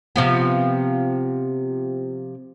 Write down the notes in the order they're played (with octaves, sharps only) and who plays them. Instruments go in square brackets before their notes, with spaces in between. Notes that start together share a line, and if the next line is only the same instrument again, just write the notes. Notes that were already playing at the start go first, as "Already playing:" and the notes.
[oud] C3 F3 B3